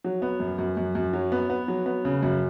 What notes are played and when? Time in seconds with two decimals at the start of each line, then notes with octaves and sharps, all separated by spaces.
0.04 F#3
0.22 B3
0.40 F#2
0.58 F#2
0.77 F#2
0.95 F#2
1.13 F#3
1.32 B3
1.50 B3
1.68 F#3
1.86 B3
2.05 C#3
2.23 F#2